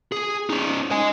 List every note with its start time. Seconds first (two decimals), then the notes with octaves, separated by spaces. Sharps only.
0.12 G#4
0.50 C#4 D#4
0.91 D#5 G#5